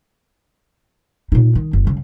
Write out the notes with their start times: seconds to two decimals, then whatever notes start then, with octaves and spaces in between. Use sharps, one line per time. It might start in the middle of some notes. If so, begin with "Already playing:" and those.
1.32 A#2 D#4
1.55 D#3
1.73 F#1
1.85 F#2 C#3